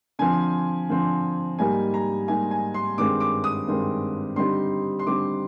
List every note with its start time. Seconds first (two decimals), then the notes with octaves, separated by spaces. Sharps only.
0.19 D3 F3 C4 G#5
0.89 D3 F3 C4
1.59 G#2 G3 A#3 D#4 G#5
1.94 A#5
2.28 G#2 G3 A#3 D#4 G#5
2.51 G#5
2.74 C6
2.98 G2 D#3 G#3 C4 D6
3.20 D6
3.44 D#6
3.68 G2 D#3 G#3 C4
4.36 D3 G3 C4 D#4 C6
4.99 C6
5.06 D3 G3 C4 D#4 D6